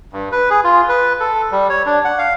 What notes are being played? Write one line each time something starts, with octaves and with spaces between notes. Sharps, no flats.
G2
B4
G#4
F4
B4
A4
G3
C#5
D4
F#5
F5